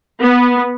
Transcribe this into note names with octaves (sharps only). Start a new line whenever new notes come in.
B3